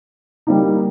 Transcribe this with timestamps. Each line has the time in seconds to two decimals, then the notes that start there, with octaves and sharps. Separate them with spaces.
0.47 G3 A#3 D#4